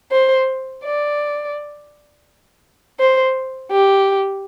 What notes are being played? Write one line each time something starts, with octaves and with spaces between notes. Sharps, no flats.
C5
D5
C5
G4